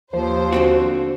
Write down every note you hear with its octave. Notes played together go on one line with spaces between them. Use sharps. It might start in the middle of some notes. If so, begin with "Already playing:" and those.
D#2 F3 C5
D3 C4 F#4